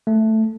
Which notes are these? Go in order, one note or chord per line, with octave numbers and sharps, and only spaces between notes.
A3